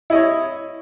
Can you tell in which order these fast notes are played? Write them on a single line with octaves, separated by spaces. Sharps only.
E4 D#5 C#5